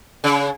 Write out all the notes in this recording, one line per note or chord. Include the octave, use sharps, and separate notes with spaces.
C#3